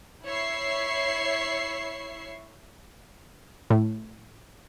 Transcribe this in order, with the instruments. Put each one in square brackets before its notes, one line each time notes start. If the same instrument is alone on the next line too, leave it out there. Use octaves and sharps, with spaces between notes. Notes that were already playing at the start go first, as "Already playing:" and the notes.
[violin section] E4 C#5 E5 C#6 C7
[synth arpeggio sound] A2